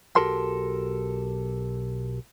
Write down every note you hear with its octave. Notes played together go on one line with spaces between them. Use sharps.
B1 F#4 G4 A4 A#4 C6